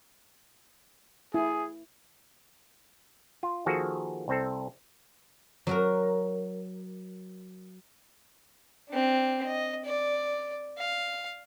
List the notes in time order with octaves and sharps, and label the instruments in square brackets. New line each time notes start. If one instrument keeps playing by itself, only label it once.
[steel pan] E4 [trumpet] G#4
[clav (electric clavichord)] F4
D#3 F3 A#3 F#4 G#4 A4
C2 C4 A4
[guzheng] F#3 F#4 A#4
[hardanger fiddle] C4 D4
D#5
D5
F5